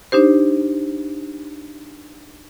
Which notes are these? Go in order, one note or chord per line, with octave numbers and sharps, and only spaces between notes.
D4 D#4 G4 C5